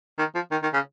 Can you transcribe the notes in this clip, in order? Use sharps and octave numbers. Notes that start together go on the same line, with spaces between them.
D#3
F3
D#3
D#3
C#3